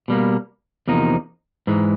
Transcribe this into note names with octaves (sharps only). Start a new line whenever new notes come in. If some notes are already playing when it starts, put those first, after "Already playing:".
B2 G3 A#3
E2 C3 F3 A#3 D#4
G#2 E3 G#3